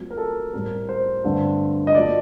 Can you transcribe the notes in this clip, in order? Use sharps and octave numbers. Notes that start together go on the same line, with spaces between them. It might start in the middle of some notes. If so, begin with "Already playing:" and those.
Already playing: A#2 F#3 A3 C4
A#4
A4
A2 G3 C4 A#4
C5
G2 D3 A3 C4
D#5
A#2 F#3 A3 D5